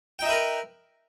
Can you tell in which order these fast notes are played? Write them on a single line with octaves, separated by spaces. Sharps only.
G5 D#4 E5 B4 A#4